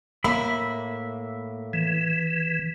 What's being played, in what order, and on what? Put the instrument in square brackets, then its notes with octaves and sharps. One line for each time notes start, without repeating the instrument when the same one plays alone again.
[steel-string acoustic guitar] A2 A#3 [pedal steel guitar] E5 B5
[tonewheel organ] E3